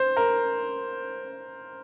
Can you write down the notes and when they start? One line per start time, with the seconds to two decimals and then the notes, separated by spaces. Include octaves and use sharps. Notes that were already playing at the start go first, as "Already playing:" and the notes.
Already playing: C5
0.17 A#4